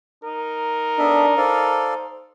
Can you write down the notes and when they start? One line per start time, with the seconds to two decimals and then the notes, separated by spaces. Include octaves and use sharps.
0.24 D#4 A#4
0.99 B3 D4 A4 E5
1.37 A4 C5 D5 F5